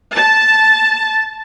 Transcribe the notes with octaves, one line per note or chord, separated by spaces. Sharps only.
A5